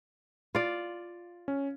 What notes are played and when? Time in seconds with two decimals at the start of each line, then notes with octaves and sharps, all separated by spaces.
0.55 F4 D5
1.48 C#4